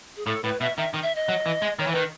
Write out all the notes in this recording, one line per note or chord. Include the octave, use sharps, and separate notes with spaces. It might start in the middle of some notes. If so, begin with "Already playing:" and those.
G#4
A2 A4
A2 B4
B2 E5
D#3 E5
D#3
E5
D#5
F#3
E3
G#3
D#3 C#5
E3
D#3 B4